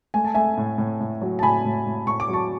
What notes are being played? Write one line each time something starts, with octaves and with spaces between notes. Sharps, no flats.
A3 G#5
A5
A3 E5 G#5
A2
A2
A2
F#3
A5
A2 G#5 B5
A2
A2
A2 C#6
D6
F#3 A5 C#6